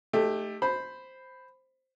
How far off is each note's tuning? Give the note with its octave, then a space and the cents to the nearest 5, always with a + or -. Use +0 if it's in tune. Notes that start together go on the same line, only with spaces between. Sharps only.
A3 +0 D#4 -15 G4 +20
C5 +0 B5 +10